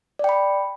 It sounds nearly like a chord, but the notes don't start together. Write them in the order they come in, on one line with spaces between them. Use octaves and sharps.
D5 G5 B5